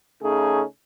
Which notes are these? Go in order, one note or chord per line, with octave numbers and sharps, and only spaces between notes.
C#3 A3 C#4 D#4 G#4